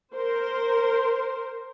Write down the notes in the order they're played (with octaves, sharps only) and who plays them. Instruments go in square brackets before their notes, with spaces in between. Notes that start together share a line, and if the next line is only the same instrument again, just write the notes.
[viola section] A#4 C5